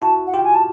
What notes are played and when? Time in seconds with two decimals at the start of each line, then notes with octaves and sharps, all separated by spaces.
0.02 E4 F#4 A5
0.27 F#5
0.34 F4 G4 G5
0.44 G#5
0.55 A5